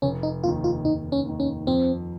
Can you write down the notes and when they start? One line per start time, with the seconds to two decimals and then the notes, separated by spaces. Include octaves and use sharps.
0.02 F1 C#4
0.23 D#4
0.44 D#2 D#3 F4
0.64 F4
0.84 F1 D#4
1.12 C#4
1.25 D#2 D#3
1.40 C#4
1.67 F2 C4